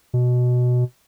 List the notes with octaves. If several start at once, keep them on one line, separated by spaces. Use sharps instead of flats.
B2